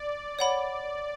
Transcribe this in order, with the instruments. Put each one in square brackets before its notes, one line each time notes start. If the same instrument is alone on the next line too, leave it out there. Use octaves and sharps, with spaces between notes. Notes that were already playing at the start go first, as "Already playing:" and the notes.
Already playing: [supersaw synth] D5
[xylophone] C#5 F#5 B5